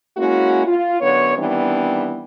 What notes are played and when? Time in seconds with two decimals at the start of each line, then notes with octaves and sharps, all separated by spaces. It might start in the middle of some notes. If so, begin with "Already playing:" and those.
0.17 G#3 A#3 C#4 E4 F#4
0.66 F4
1.01 F#2 D3 B3 C#5
1.37 D#3 E3 G3 B3 C4 D4